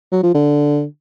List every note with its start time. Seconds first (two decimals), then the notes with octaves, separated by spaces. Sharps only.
0.12 F#3
0.23 F3
0.34 D3